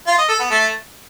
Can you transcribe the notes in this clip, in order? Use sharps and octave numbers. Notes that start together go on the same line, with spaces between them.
F4
D#5
A4
B3
A3